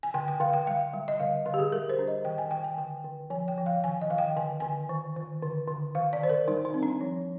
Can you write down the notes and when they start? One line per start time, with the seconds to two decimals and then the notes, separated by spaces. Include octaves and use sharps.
0.03 G#5
0.14 D3 G5
0.28 G5
0.40 D3 F5
0.53 G5
0.67 G3 F5
0.93 G3
1.08 D#5
1.20 D3 F5
1.46 D3 F5
1.54 G4
1.59 G#4
1.72 G3 A#4
1.89 C5
1.99 D4
2.08 D#5
2.25 D#3 G5
2.38 G#5
2.51 D#3 G5
2.64 G#5
2.78 D3 G5
3.04 D3
3.30 F3 G#5
3.48 G5
3.58 F3
3.66 F5
3.84 D#3 G#5
4.01 D#5
4.10 D#3 F5
4.18 G5
4.37 D3 G#5
4.60 D3 G#5
4.89 D#3
5.16 D#3
5.42 D3
5.68 D3
5.95 D#3 F5
6.13 D5
6.21 D#3 C5
6.29 A#4
6.48 G3 D#4
6.65 D#4
6.74 C4
6.83 D4
7.01 F3